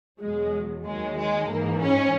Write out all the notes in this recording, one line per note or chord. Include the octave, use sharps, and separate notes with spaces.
E2 B2 F#3 G#3
D#2 D#3 F#3 G#3
G#3
G#2 E3 A#3
C#4